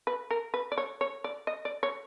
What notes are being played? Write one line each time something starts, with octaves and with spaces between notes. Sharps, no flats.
B4
A#4
B4
D5
C#5
C#5
D5
D#5
D5
C#5